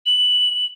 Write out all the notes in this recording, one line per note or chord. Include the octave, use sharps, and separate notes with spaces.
F#7